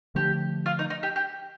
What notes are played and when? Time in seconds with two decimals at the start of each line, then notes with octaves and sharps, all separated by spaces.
0.15 D3 F3 A3 D4 G4
0.66 F4
0.79 D#4
0.90 D#4
1.03 G4
1.16 G4